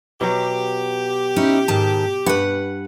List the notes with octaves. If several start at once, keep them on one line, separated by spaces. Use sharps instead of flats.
B2 F#3 G4
C#4 D#4 E4
G#2 D#3 A5
G2 B4 F#5